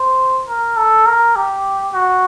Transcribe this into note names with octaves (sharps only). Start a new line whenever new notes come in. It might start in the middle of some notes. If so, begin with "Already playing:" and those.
Already playing: C5
A#4
A4
A#4
G4
F#4